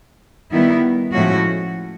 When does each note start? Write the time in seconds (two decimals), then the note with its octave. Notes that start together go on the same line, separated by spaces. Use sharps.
0.51 D#3 G3 B3 E4
1.13 A2 F3 G#3 C#4 F#4